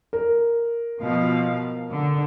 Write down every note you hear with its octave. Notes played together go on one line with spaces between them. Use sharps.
A#4
B2 F3 F5
D3